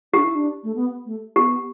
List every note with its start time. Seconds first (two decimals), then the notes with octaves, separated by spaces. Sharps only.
0.14 D4 G4
0.24 E4
0.35 D4
0.64 A3
0.75 B3
1.06 A3
1.36 B3 G4